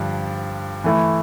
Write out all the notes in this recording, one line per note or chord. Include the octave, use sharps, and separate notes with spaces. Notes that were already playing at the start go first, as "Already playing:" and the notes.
Already playing: G2 D3 F3
E3 A3 E4